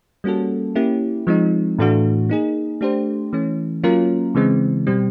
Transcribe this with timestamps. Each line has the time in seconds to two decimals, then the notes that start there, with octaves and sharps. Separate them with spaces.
0.24 G3 A#3 C#4 F#4 A4
0.75 A#3 C#4 E4 G4
1.27 F3 G#3 C4 D#4
1.79 A2 E3 A3 D4 F#4
2.29 A#3 D#4 G#4
2.81 A3 D4 G4 C5
3.33 E3 A3 C#4
3.84 F#3 A#3 C#4 F4 A#4
4.35 C#3 E3 G#3 C4
4.87 B2 G3 C4